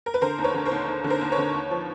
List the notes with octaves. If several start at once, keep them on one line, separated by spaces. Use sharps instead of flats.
A#4
B4
D3 A#4 C5
D#2
B4 C#5
D3
A#4 C5
D#2
D#2
D3
A#4 C5
D#2
B4 C#5
D3
D#2
F3